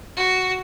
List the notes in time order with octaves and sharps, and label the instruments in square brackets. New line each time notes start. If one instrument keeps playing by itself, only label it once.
[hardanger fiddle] F#4